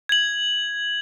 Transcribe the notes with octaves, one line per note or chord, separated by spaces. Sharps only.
G#6 F#7